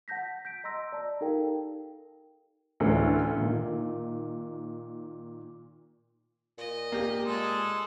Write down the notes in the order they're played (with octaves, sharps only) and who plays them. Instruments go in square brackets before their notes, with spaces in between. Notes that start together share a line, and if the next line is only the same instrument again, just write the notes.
[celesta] F#5 A5 G6 A#6 B6
G6 B6 D7
D#5 A#5 C6 E6 A#6
D5 A5 A#5
D#4 G4 A4 A#4 F5 G5
[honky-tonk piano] D2 A2 E3 C#4 A4
A#2 D#3
[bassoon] A#2 [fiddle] D#5
[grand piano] A#3 G4
[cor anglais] G#3 [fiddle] G#4 A4